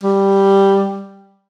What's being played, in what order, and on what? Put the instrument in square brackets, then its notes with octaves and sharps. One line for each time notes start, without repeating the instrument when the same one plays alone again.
[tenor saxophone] G3